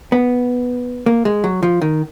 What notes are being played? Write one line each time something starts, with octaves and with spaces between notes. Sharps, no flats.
B3
A#3
G#3
F#3
F3
D#3